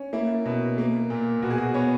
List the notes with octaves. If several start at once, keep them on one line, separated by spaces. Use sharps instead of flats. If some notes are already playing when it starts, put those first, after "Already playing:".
Already playing: C#4
A#3 E4
B2
A#3
A#2
B2 F#4
G#4
F#4
B3 C#5